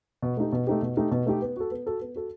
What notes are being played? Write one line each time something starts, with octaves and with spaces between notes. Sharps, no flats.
B2
A3 D#4 G4
B2
A3 D#4 G4
B2
A3 D#4 G4
B2
A3 D#4 G4
B3
F#4 A4
B3
F#4 A4
B3
F#4 A4